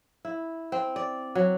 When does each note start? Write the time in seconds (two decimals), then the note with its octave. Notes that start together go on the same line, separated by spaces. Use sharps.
0.25 E4
0.72 C4
0.96 D5
1.35 F#3